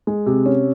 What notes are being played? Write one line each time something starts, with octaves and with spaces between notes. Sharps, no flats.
G#3
C3
C#4